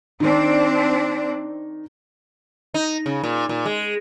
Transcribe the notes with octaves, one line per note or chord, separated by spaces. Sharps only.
D#3 C4 D4 D#4
D#4
C#3
A#2
A#2
G#3